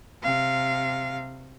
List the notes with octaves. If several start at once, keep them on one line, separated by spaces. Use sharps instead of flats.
C3 F5